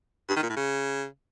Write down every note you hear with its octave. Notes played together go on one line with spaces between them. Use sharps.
G2
D#3
A#2
A2
C#3